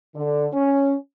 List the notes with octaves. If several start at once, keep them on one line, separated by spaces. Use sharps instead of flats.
D3
C#4